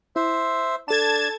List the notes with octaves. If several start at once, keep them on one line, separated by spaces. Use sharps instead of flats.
E4 C5 E5
D4 A4 A5 G#6 A6 E7